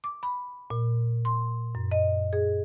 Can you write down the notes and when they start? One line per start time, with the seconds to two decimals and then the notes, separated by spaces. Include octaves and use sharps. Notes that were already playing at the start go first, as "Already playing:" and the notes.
0.04 D6
0.23 B5
0.70 A#2
1.25 C6
1.75 F#2
1.92 D#5
2.33 G#4